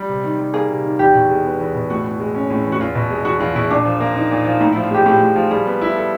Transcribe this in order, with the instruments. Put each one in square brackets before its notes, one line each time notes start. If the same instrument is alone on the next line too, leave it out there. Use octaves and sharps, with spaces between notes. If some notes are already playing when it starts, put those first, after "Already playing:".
Already playing: [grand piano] G3
C3
D#3
G3
[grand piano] A#3 [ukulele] G#4
[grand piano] C3
D#3
[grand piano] E2 [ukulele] G4
[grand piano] B2
G#3
B3
E2
B2
[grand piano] A2 [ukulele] F#4
[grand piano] E3
G#3
C#4
A2
E3
[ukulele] F#4
[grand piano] E2 [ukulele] F4
[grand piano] B2
G#3
[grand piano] E2 [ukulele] F#4
[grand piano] E2 [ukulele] F4
[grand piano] B2 [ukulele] E4
[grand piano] A#2 [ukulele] D4
[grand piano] F3
A#3
D#4
A#2
F3
[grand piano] A2 [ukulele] D#4
[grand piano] F3 [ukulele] E4
[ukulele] F4
[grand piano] G#3 [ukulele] G4
[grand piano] A2 [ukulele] G4
[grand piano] A2
F3
[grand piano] G3 [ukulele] G#4
[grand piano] B3
E4
A4